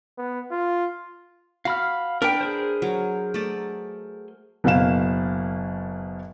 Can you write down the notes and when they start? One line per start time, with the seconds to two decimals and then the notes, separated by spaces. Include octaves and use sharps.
0.18 B3
0.51 F4
1.65 F#4 F5 B5 F6
2.22 D4 A#4 B4 G5
2.41 G#4 A#4 C5
2.82 F#3
3.34 A3 D5
4.64 F#1 B2 A#3 F5 E7